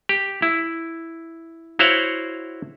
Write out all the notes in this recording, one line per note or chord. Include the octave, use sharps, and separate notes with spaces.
G4
E4
E4 F#4 C5 C#5 F5 F#5